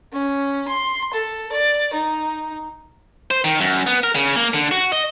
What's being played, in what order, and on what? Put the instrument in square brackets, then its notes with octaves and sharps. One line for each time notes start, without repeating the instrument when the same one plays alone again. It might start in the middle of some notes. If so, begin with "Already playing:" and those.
[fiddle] C#4
C6
A4
D5
D#4
[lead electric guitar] C5
D#3
F#2
B3
A#4
C#3
A#3
D3
F#4
D#5